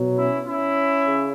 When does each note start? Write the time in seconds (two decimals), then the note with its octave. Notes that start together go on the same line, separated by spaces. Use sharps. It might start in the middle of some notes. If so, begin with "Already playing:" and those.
Already playing: B2 F#3
0.17 C#4 E4
0.46 C#4 E4
1.04 C#3